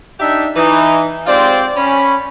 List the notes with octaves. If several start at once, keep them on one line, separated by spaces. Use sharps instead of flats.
D4 D#4 G4 E5
E3 D#4
G#2 C4 F4 G4 C5 D5
C#4 B5